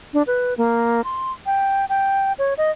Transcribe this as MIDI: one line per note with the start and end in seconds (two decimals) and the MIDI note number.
0.14 0.23 62
0.27 0.54 71
0.58 1.01 58
1.04 1.32 84
1.46 1.85 79
1.89 2.33 79
2.39 2.54 73
2.58 2.71 75